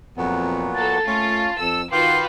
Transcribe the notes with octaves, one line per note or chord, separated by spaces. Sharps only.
F2 A#2 F#3 B3
A#3 A4 A5
A3 C#4 F4
F2 A4 E6
D#3 F4 F#4 B4 F5 G5 C6 D6